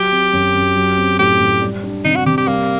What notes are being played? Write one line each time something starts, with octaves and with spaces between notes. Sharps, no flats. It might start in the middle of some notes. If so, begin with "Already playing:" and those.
Already playing: F#3 G4
C4
F#2
F#2
F#3
C4
A2 G4
A2
G3
D4
C3 D#4
F#4
C3 G4
G4
G3 A#3